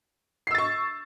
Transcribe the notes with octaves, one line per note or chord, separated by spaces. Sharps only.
C#6 E6 A6 C7